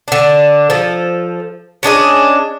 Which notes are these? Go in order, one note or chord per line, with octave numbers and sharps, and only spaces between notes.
D3 D4
F3 A4
C#4 D4 G#4 D#5